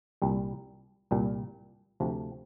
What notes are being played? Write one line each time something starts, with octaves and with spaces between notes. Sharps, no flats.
C2 A#2 G3
C2 A#2 G3
D2 C3 F3